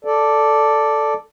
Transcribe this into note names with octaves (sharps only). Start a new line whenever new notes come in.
A4 D5